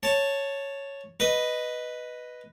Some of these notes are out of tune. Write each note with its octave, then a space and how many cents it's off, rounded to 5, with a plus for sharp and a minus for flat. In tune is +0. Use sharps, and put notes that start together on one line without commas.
C#5 +0 A5 +5
B4 +0 D#5 +0